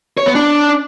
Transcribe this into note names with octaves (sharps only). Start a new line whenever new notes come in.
C#5
B3
D4